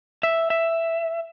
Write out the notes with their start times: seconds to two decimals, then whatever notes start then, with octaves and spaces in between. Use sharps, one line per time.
0.23 E5
0.50 E5